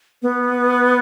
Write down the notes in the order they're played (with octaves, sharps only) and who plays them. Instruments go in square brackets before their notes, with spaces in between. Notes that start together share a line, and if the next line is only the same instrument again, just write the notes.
[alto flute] B3